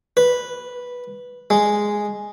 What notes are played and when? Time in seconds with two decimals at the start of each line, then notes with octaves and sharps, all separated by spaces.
0.17 B4
1.50 G#3